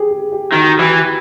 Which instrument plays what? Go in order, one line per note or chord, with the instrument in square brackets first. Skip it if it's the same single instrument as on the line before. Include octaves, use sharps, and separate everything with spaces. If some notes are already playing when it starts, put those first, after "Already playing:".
Already playing: [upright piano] G4 G#4
G#4
G4
[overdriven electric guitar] D#3 [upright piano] F#4
[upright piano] G4
F#4
G4
[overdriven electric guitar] E3 [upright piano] F#4
[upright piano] G4
F#4